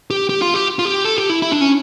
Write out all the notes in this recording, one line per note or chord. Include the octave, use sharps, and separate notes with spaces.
G4
G4
F4
G4
F4
G4
A4
G4
E4
E4
D4
C#4